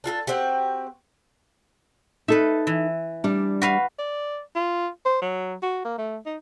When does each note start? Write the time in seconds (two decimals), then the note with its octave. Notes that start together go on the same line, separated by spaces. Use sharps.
0.04 D4 F4 F#4 A4
0.27 C4 F#4 G4
2.28 D#4 A4 B4 E5
2.67 E3
3.24 G3 D4
3.62 F#4 B4 F5
3.99 D5
4.56 F4
5.06 C5
5.22 F#3
5.63 F#4
5.85 A#3
5.98 A3
6.26 D#4